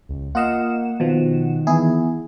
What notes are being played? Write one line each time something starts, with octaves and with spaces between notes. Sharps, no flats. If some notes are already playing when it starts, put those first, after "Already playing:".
C#2
A#3 F4 D#5 F5 F#5 E7
B2 D#3 F3
E3 B3 E4 G#4